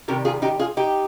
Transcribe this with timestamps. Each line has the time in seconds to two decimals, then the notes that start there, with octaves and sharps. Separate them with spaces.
0.08 C3 D#3 G3 G4 A#4
0.25 F4 G#4
0.42 D#4 G4
0.60 F4 G#4
0.77 D#4 G4